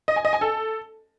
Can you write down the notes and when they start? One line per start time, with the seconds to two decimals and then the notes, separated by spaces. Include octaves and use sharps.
0.08 D#5
0.16 G#5
0.25 D#5
0.33 G#5
0.41 A4